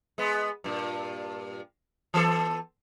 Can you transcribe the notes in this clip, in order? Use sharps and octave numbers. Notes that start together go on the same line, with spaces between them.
G#3 B3
G2 A#2
E3 B3 A4